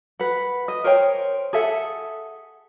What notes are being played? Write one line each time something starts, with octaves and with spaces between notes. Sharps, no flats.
B4 F#5
D#5
A#4 C5 C#5 G5
G#4 A4 E5 F#5